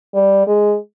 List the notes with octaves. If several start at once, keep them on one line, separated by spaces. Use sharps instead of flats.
G3
G#3